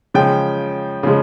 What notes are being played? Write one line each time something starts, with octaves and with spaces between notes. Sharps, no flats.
C#3 F3 G#3 G5
C#3 F3 G#3